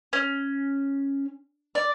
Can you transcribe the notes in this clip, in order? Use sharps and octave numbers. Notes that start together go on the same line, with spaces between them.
C#4
D5